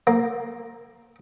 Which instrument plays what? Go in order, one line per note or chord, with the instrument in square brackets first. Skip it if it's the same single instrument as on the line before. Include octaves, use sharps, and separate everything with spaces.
[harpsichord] A#3